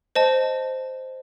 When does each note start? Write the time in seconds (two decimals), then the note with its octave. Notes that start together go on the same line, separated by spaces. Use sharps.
0.15 C5 D#5 A5